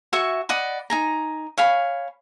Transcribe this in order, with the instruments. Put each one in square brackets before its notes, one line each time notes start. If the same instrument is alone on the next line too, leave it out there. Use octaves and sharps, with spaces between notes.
[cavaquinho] F#4 E5 G#5 C#6
D5 D#5 F#5 B5
D#4 G#5 A#5
C#5 F5 G#5 B5